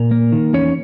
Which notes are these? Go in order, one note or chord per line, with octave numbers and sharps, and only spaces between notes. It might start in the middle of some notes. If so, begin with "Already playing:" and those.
Already playing: A#2 A#4
A#3
D#3
E2 C#4 C#5